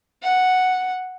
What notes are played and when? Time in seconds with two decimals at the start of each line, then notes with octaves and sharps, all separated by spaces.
0.22 F#5